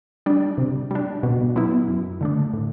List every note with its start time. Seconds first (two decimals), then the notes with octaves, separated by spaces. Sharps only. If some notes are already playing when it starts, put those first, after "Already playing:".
0.26 G3 D4
0.58 C3
0.91 G3 D4
1.23 B2
1.56 F#3 B3 E4
1.88 F#2
2.21 D3 A3 D4
2.53 A2